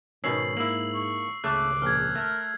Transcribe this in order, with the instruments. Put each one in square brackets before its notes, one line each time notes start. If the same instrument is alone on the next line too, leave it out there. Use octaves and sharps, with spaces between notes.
[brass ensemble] G#2 [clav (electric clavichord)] B2 D#3 C#4 [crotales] E6 C7 F#7
[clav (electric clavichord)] A#3 E4 [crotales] E6 F#7
[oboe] C#6
[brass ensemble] G#1 C#2 [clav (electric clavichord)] C#3 A3 [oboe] D6 [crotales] F#6
[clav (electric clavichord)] A#1 [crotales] F6 G#6
[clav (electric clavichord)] A3 [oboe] A#4